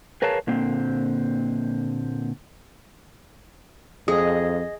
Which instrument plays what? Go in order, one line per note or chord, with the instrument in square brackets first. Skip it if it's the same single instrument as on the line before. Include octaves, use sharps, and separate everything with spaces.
[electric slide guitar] G#4 A#4 B4 C#5 F5 A5
A#2 D3 A#3 C4
[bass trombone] F2 [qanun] G#4 [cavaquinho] D#5